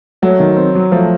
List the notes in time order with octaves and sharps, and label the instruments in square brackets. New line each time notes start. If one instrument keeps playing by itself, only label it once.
[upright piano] F#3 [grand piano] A3
[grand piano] D#3
C4
F#3
[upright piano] F3 [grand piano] A3